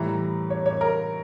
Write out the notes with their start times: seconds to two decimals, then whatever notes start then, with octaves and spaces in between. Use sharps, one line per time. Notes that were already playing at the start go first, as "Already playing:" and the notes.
Already playing: A2 E3 G3 A#5
0.50 C#5
0.66 C#5
0.81 A#4